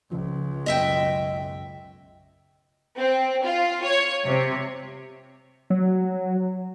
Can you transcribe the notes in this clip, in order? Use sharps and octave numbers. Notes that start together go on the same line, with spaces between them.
C#2 C#3 F3
B1 F#2 D#5 E5 G5
C4
F4
C#5
C3
F#3